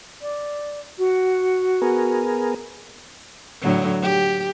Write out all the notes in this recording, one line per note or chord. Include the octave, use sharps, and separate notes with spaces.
D5
F#4
B3 G#4 A#4
A2 D3 F#3
G4